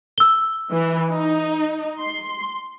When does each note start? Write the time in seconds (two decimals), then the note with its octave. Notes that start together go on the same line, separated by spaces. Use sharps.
0.18 E6 G7
0.71 E3
1.11 D#4
1.99 C6